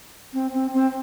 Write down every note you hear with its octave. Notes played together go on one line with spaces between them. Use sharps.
C4
C4
C4